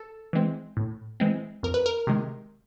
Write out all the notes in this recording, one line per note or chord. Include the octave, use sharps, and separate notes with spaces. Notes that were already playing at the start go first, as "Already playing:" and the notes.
Already playing: A4
E3 G#3 C4
A2
E3 G#3 C4
F2 A#4
B4
A#4
C3 D#3 G#3